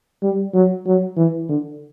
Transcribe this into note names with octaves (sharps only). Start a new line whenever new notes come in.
G3
F#3
F#3
E3
D3